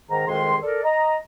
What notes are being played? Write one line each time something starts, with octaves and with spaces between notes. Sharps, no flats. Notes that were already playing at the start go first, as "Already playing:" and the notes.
G#2 D#3 A#5
C2 F2 D#3 G#3 G#4 C6
A4 A#4 D5
D#5 A#5